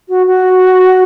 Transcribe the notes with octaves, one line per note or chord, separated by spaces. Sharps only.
F#4
F#4